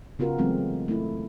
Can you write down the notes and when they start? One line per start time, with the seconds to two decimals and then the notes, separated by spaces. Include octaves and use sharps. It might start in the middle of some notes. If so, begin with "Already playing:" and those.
0.19 C#3 B3 F4 F#4 A#4
0.38 E3 F#3 G#3 A3 B3 C4
0.88 A3 E4